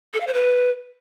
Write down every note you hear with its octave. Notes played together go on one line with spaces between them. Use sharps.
A4
F5
C5
B4